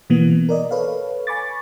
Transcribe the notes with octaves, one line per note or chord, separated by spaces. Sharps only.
B2 E3 A#3 B3
A#4 D5 D#5
A4 B4 C#5 F5
G#5 B5 C#6 D6 A6